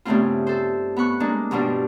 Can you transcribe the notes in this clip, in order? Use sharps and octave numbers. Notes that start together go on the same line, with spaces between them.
G2 C#3 A3 B3 C4 F4
A4 C5
B3 B5 C#6 F#6
G#3 A#3 D4
G2 B2 F3 G3 D4